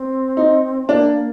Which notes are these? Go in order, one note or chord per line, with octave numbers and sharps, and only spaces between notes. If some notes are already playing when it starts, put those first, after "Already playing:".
Already playing: C4
D#4
A#3 D4
A#3